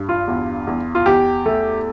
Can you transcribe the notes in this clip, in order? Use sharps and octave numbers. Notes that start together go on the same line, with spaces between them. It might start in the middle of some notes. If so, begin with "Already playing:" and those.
Already playing: G2
F4
E2
E2
F4
E2 G4
A3